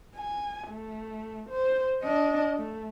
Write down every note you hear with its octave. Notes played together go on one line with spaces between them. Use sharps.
G#5
A3
C5
D4 D#5
A3